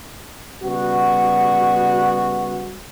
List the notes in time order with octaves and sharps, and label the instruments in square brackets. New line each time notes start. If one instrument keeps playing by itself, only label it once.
[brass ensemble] C#3 G3 B3 F#4